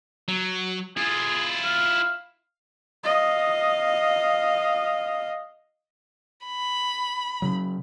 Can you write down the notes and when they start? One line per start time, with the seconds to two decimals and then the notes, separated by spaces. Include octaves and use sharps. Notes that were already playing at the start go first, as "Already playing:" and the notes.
0.28 F#3
0.97 E4 F4 G#4
1.65 F5
3.04 D#5 F5
6.46 B5
7.42 C#3 F#3